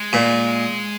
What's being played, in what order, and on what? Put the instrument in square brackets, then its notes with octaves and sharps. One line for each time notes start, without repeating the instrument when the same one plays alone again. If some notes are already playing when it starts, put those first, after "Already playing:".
Already playing: [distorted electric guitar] G#3
[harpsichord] A#2